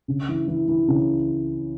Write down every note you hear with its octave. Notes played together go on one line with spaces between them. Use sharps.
C#3
E3
E3
E3
C#3